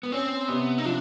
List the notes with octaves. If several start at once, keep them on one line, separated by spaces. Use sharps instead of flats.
B3
C4 C#4
C3 B3
D#4
F3 D4